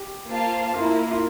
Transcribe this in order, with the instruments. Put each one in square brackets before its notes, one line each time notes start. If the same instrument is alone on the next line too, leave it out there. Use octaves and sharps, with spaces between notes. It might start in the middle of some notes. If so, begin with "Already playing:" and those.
Already playing: [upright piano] G4
[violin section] A#3 F4 C5 F5 A5
[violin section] A#3 E4 A#4 [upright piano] F4
[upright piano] F4